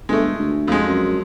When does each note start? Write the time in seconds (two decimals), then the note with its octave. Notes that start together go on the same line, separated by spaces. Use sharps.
0.09 G1 G#3 A3
0.39 D2
0.68 F2 G#3
0.87 F#2